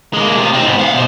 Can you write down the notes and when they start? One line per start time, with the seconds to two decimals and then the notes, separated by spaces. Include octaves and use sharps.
0.13 G#3 A#3
0.38 C3 F4
0.53 C4 D#4
0.66 G#2 B3
0.79 F5 F#5
0.94 B2 C5